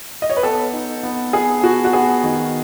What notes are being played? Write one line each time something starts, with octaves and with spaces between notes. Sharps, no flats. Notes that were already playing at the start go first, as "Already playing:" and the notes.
D#5
C#5
B4
B3 A4
D#4
B3
B3 G#4
B3 F#4
F#4
B3 G#4
D#3